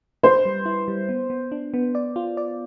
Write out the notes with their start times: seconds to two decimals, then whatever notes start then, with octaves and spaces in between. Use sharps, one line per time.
0.23 B4 C5
0.45 G3
0.66 E4
0.88 G3
1.09 B3
1.30 B3
1.52 D4
1.74 B3
1.95 D5
2.16 F4
2.37 D5